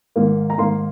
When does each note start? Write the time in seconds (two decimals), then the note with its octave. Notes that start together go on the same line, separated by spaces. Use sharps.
0.16 G#2 D#3 A#3
0.50 A#5
0.58 G#2 D#3 A#3 C6